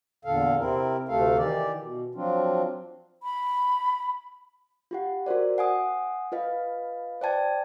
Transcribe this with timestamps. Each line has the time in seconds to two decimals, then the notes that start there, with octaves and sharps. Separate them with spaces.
0.25 E2 A#2 D3 A4 F5
0.59 C3 C4 E4 A#4
1.09 D2 C3 A3 A4 F5
1.38 D#3 E3 G4 D5
1.80 B2
2.15 F3 F#3 C4 D4 F4
3.23 B5
4.91 F4 G4 F#5
5.26 F#4 A#4 C5 D5
5.58 F#5 G#5 D#6
6.32 F4 B4 D#5 F5
7.21 C5 D5 G5 A5 G#6